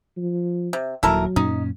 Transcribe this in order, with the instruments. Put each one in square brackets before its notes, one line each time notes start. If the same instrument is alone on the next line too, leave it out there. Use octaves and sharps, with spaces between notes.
[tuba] F3
[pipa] C3
[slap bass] D#1 D#2 [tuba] F#3 [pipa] E4 A4 A#4
[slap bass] F#2 A#2 C#4 [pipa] D#4